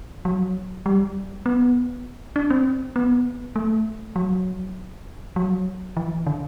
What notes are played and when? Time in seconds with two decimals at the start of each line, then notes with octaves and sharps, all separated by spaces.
0.25 F#3
0.86 G3
1.46 B3
2.36 D4
2.50 C4
2.96 B3
3.56 A3
4.16 F#3
5.36 F#3
5.97 E3
6.27 D3